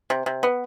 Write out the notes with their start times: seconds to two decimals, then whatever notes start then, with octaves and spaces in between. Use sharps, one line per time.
0.10 C3
0.26 C3
0.43 B3